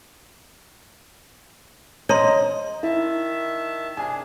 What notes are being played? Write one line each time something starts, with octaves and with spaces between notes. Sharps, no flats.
C#5 D#5 A#5 C6
D#3 E4 E5 A5
C3 D4 G#4 G#5